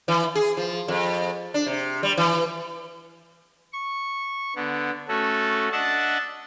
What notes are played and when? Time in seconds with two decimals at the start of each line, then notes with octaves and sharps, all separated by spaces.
0.08 E3
0.35 G#4
0.57 F3
0.88 F2
1.54 D4
1.67 C3
2.03 G3
2.18 E3
3.73 C#6
4.56 D3 B3
5.08 A3 C#4 F#4 A4
5.72 D4 D#5 E5 F#5 A5